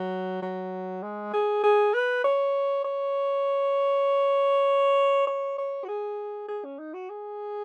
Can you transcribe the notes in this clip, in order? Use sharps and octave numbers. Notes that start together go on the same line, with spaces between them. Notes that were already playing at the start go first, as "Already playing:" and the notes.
Already playing: F#3
F#3
G#3
G#4
G#4
B4
C#5
C#5
C#5
C#5
F#4
G#4
G#4
C#4
D#4
F#4
G#4